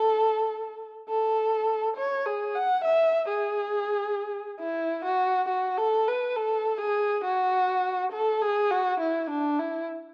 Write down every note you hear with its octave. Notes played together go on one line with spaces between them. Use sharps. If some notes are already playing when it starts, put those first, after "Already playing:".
Already playing: A4
A4
C#5
G#4
F#5
E5
G#4
E4
F#4
F#4
A4
B4
A4
G#4
F#4
A4
G#4
F#4
E4
D4
E4